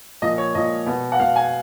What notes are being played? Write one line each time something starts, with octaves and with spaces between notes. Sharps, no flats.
A#2 F3 D#5
C#5
A#2 F3 D#5
B2
F#5
B2 F5
G#5